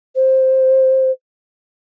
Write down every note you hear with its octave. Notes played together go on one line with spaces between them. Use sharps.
C5